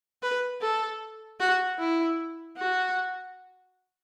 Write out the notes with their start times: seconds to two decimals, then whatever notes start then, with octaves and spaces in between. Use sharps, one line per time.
0.22 B4
0.61 A4
1.40 F#4
1.79 E4
2.57 F#4